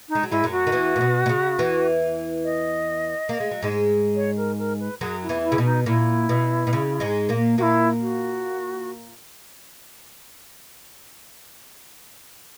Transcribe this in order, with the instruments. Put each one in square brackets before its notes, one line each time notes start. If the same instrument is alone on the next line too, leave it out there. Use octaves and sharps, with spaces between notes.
[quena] D#4
[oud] G#3
F#3
[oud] G#2 G#3 [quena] E4
[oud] F#2 F#3
[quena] F#4
[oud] D#3
E2 E3
A#2
B2
B2
C#3
E2 E3
[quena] D#5
[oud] A#3
G#3
F#3
G#2 G#3
[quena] C#5
A#4
A#4
B4
[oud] F#2 F#3 [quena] G#4
[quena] E4
[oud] E2 E3
[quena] E4
[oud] C#3
B2
[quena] D#4
[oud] A#2 [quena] E4
[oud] B2
B2
C#3
G#2 G#3
A#2 A#3
[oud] A#2 A#3 [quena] E4 F#4
[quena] F#4